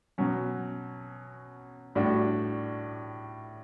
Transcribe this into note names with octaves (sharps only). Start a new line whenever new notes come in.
B2 F#3 C#4
A2 G3 D4 F#4